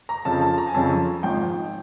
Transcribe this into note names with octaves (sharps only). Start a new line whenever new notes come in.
A#5
F2 C#3 F3 A5
A5
A#5
G#5
F2 C#3 F3 A5
G#1 G#2 F3 G5